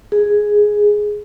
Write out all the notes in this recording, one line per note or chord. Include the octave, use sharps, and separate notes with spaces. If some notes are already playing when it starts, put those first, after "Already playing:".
G#4